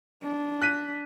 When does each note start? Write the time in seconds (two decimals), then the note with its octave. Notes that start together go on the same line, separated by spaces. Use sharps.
0.23 D4
0.62 F#6 B6 D#7